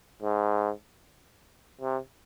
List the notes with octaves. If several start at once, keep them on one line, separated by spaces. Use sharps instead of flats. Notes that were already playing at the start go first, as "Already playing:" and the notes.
G#2
C3